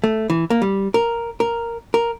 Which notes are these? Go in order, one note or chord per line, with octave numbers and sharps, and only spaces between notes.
A3
E3
A#3
G3
A#4
A#4
A#4